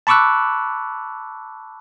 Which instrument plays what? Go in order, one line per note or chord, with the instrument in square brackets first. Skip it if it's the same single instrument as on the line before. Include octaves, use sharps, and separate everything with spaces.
[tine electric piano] A5 B5 C#6 D6 E6 F#6